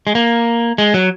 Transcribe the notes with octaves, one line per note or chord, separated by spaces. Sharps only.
G#3
A#3
G#3
F#3